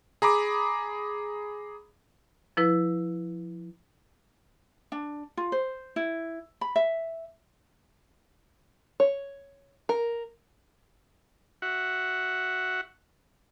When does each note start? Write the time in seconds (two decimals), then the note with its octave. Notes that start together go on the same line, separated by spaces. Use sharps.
0.22 G#4 A#5 B5 D6
2.57 F3 E4 B4
4.92 D4
5.37 F4
5.52 C5
5.96 E4
6.61 B5
6.76 E5
9.00 C#5
9.89 A#4
11.62 F#4 E5 F#5